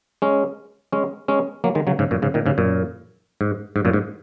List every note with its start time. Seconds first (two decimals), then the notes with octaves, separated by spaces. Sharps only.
0.22 G#3 C#4
0.92 G#3 C#4
1.28 G#3 C#4
1.64 F#3 A#3
1.75 D#3 G#3
1.87 C#3 F#3
1.99 G#2 C#3
2.11 F#2 A#2
2.22 G#2 C#3
2.34 A#2 D#3
2.46 G#2 C#3
2.58 F#2 A#2
3.41 G#2
3.76 G#2
3.85 F#2 A#2
3.93 G#2